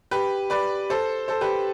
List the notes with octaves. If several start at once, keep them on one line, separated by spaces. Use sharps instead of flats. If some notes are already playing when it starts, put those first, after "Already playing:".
G4 B4
B4 D5
A4 C5
A4 C5
G4 B4